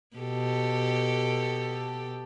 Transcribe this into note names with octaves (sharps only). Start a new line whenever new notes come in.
B2 G4 A4